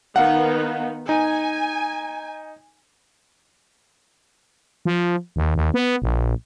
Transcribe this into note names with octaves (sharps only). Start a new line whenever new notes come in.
D#3 B3 D#4 F5 F#5
D#4 G#5
F3
D#2
D#2
B3
A#1